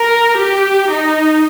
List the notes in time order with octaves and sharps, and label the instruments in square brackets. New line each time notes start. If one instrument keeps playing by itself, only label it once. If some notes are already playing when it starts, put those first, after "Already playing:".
Already playing: [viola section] A#4
G4
D#4